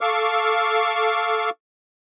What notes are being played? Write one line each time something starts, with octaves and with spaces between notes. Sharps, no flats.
A4 F5 C#6 D6 E6 F6